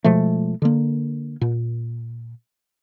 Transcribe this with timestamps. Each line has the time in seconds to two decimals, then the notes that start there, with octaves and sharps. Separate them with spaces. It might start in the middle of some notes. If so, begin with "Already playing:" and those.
0.04 B2 F3 G#3 A3
0.62 D3 A#3
1.41 A#2